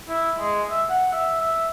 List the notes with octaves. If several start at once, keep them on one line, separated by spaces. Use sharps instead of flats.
E4
G#3
E5
F#5
E5
E5